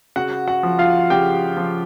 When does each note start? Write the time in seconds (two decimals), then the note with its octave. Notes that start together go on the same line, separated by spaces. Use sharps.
0.16 C#3 F#4 F#5
0.47 F#4 F#5
0.63 F3
0.79 F4 F5
1.10 C#3 G4 G5
1.57 F3